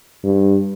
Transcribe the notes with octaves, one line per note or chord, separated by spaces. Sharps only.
G2